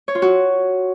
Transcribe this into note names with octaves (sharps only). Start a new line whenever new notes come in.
C#5
F4
F#4